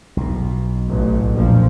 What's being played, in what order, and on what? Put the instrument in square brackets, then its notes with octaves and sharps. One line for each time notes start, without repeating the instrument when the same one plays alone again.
[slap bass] B1 B2
[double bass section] A1
A#1 F2 F3